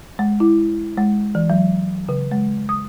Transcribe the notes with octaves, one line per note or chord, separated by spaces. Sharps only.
G#3
E4
G#3
E3
F#3
C#3
G#3
D#6